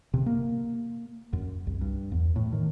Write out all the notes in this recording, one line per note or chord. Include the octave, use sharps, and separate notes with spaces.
C3
A#3
F#2
C2
G2
E2
A2
D#3